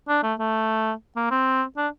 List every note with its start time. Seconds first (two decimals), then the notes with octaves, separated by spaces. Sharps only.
0.09 D4
0.23 A3
0.39 A3
1.16 A#3
1.31 C4
1.77 D4